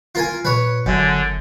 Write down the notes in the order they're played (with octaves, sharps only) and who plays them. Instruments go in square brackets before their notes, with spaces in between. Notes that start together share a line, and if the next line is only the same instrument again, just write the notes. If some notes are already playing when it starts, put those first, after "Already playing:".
[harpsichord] F4 A#4 G#5
[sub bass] A#2 [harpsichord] B4 C#5
[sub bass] G1 [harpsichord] F#2 [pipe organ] D3